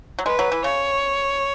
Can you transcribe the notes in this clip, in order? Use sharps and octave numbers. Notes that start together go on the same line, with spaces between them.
F#3
G#3 B4
F#3
E3
C#3 C#5